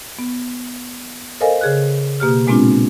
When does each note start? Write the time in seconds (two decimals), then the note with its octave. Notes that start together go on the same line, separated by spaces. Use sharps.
0.19 B3
1.41 A4 A#4 C5 D#5 F5 G#5
1.61 C#3 G#4 F#6
2.20 B2 A#3 G4 F6
2.47 A#2 G#3 B3 C4 D4 F4